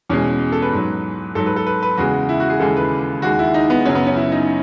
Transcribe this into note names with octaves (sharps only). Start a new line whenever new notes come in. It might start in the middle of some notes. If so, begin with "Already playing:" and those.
E2 B2 G#3 C#4
A4
B4
G#2 F#3
G#2 F#3 A4
B4
A4
B4
B4
E2 C#3 G#3 F#4
E4
F#4
G#4
D#2 C#3 E3 G#3 A4
B4
D#2 D#3 G#3 F#4
E4
D#4
B3
F#2 C#3 F#3 C#4
B3
C#4
E4
D#4